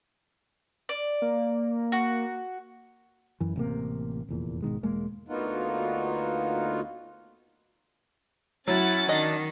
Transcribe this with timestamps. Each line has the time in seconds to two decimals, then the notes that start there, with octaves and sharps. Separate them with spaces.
0.89 D5
1.22 A#3
1.92 F#4
3.41 F#2 E3
3.56 A1 C3 A#3
4.29 F1 E2 A#2
4.62 G#1 B2 D#3 G#3
4.83 E1 G#3 A#3
5.28 D2 A#3 B3 D#4 F4 F#4
8.68 F#3 C#4 E4 F#5 A6
9.09 D#3 D4 D#5